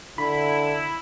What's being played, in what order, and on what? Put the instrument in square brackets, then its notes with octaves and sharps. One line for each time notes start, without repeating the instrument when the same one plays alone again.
[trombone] D3 [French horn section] E4 [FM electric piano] B5